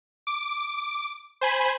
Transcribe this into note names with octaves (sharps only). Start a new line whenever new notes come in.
D6
C5 G#5 B5